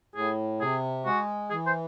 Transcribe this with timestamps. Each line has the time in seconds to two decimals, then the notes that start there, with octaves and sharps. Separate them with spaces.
0.15 A2 G#4
0.61 C3 G#4
1.05 G#3 F#4
1.50 E3 G#4
1.66 C5